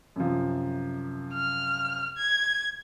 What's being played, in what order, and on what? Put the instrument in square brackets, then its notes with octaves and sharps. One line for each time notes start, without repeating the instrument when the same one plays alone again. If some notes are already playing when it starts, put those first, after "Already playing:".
[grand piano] F#2 C3 F3
[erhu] F6
G#6